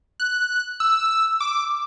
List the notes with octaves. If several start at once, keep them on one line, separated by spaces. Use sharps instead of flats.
F#6
E6
D6